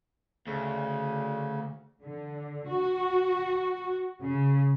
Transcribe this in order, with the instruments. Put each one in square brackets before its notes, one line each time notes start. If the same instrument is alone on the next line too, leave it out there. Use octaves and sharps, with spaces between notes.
[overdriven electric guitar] D2 [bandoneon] C#3
[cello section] D3
F#4
C#3